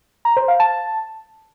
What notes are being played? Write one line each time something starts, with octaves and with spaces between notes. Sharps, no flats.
A#5
C5
F5
A5